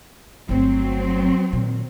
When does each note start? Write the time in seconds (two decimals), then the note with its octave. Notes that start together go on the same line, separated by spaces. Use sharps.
0.49 G1 F#3 A3 C4
1.53 A#2 D#3